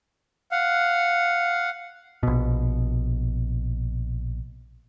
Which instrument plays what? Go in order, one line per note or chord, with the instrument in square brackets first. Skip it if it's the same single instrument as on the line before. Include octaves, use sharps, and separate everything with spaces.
[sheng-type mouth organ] F5 F#5
[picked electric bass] A#1 B2